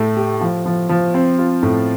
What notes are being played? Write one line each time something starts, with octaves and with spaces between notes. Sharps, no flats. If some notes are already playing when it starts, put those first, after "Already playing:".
Already playing: A2 A3
G4
F3
F3
F3
C4
F4
A2